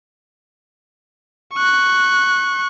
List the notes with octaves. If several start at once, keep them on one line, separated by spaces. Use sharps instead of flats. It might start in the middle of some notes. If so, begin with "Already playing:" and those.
C#6 F#6